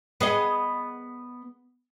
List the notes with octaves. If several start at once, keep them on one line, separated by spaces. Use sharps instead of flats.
B3 G#4 D#5